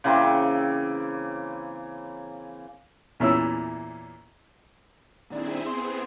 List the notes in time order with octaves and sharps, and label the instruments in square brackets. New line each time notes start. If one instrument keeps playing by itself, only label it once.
[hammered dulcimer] C#3 E3 A#3 C4
[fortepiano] E2 A#2 C#4 E4 E6
[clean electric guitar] A#2 D#3 D4 [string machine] C4 E4 G#4
[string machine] B3 C4 G#4 [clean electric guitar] C6